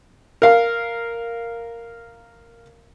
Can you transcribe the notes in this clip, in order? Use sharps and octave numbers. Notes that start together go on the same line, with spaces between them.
A#4 F5